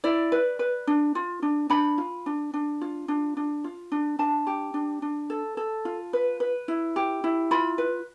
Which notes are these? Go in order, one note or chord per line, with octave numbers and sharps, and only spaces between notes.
E4 D5
B4
B4
D4
F4
D4
D4 B5
F4
D4
D4
F4
D4
D4
F4
D4
D4 A5
G4
D4
D4
A4
A4
F4
B4
B4
E4
G4
E4
F4 B5
B4